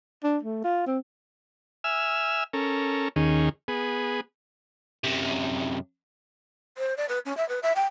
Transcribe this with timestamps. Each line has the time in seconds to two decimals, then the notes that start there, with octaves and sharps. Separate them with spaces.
0.24 D4
0.43 A3
0.64 F4
0.87 C4
1.84 E5 G#5 E6 F6
2.53 C#4 A4 A#4
3.16 D#2 D#3 C#4 G#4
3.68 B3 G#4
5.04 F#2 C3
6.78 C5
6.97 D5
7.09 B4
7.26 C#4
7.37 E5
7.49 B4
7.63 E5
7.76 G5